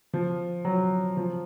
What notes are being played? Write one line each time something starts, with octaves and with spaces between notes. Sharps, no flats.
F3
F#3
F3